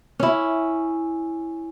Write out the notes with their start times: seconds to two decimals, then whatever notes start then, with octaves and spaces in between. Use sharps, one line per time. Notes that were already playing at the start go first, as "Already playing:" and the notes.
0.20 C#4 E4